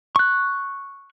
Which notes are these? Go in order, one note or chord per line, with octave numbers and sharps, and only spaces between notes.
C#6 F#6